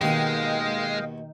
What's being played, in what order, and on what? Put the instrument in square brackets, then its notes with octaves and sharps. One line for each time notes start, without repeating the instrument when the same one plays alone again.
[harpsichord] D#2 B2 D#6 [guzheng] D#3 [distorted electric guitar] G#3 [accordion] D#5 F5 G5